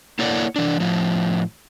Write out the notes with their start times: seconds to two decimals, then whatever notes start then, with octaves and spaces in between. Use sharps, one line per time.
0.19 A#3 E4 A4 C#5 D5 F#5
0.56 E3 D4
0.80 A2 F3